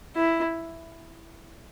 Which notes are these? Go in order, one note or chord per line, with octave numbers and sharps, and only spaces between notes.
E4